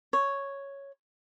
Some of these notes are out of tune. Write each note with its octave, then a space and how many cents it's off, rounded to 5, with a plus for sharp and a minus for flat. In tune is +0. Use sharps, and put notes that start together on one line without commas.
C#5 +0